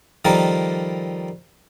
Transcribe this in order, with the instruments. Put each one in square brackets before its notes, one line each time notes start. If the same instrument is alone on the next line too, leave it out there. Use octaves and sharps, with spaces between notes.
[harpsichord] D#3 F3 G3 A4 A#4